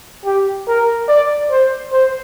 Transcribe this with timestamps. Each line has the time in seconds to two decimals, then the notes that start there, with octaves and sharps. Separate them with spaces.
0.25 G4
0.68 A#4
1.08 D5
1.51 C5
1.92 C5